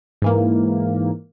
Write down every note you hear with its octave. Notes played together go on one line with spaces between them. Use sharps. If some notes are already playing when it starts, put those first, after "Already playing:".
G#2 E3 A#3